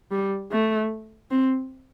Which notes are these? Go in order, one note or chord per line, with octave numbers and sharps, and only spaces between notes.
G3
A3
C4